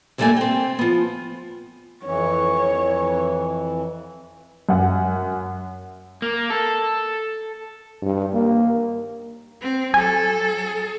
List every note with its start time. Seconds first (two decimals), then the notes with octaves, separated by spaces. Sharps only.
0.18 G2 E3 G3 A3 A#3 G#5
0.37 C4 G5
0.79 F3 B3
2.05 F2 E3 C#5
4.69 F#2 F#5
6.22 A#3
6.50 A4
8.03 G2
8.34 A#3
9.61 C4
9.94 F#3 A4 G#5